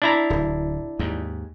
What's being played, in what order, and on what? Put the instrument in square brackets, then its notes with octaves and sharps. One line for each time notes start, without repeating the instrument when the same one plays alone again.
[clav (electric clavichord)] D4 E4 A#5
[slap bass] D1
D#2 G#2